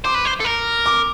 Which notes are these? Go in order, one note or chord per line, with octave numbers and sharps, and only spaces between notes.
C5 D6
B4
C5
A4
A#4
D6